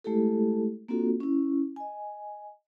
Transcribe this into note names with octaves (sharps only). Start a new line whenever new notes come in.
G#3 A3 E4 G4 A4
A#3 C4 D4 F4 F#4 A4
C#4 E4
D#5 G#5